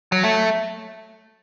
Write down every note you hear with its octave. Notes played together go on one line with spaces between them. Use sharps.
F#3
A3